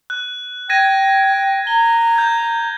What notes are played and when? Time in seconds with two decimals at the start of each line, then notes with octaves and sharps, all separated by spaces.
0.10 F#6
0.70 G5 G#6 A#6 D#7
1.67 A#5 G7
2.16 G6 G#6